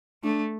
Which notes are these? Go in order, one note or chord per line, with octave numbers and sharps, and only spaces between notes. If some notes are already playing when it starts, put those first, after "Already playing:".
A3 D4